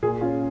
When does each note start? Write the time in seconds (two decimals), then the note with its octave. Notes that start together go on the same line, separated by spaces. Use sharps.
0.03 A#2 G#4
0.21 C#4 F4